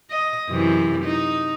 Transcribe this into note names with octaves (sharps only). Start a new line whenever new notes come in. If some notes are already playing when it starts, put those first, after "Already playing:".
D#5
F#2 C3 E3
D#4